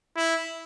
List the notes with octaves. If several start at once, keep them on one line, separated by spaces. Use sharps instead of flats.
E4